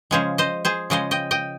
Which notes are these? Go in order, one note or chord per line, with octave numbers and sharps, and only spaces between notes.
C#3 F3 G#3 G#4 C5
C5 D#5
G#4 C5
C#3 F3 G#3 C5 D#5
D#5 G5
D#5 G5